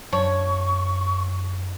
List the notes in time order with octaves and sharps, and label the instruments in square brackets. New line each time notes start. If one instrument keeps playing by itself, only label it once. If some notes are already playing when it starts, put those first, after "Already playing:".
[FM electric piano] F#2 [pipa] F3 D4 C#5 [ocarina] C#6